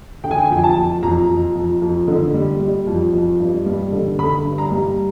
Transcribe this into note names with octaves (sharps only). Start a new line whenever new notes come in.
D3 G5
G#5
G5
G#5
F2 G5
A5
F2
F2 A#5
F2
F2
F2
D3
G3
G3
F2
F2
G2
G3
D3
D3 B5
G2
A#5
G3